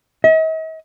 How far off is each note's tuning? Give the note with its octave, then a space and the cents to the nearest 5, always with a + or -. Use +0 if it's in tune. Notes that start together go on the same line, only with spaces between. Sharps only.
D#5 +45